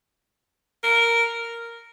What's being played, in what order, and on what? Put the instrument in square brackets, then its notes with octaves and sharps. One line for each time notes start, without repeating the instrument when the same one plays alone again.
[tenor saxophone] A#4